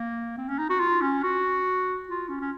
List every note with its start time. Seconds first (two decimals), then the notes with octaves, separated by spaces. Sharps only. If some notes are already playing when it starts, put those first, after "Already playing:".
Already playing: A#3
0.38 C4
0.48 C#4
0.59 D#4
0.70 F#4
0.80 F4
1.02 C#4
1.23 F#4
2.09 F4
2.29 C#4
2.41 C#4